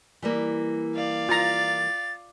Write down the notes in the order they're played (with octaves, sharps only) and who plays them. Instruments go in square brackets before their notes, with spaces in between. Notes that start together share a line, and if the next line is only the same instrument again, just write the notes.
[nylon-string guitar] E3 G3 A#3
[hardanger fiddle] D5 F5
[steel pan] F4 A#5 [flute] A6